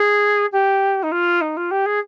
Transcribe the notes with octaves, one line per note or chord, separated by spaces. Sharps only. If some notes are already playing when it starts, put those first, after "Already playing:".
Already playing: G#4
G4
D#4
F4
D#4
F4
G4
G#4